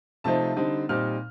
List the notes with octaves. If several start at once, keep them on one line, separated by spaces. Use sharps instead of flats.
C3 F3 A3 C4 D#4 A5
D3 G3 C4 D#4
A#2 G3 C4 D#4 F6